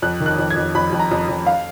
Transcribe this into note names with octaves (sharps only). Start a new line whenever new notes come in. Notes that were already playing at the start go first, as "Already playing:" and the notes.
F2 F#6
D#3
F#6
F2
G#6
F2
F2 B5
F2
A#5
F2
F2
F5